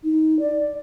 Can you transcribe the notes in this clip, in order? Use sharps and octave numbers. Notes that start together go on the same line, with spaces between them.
D#4
D5